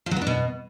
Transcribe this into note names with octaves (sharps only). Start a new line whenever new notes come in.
F3
F#3
B3
D4
B2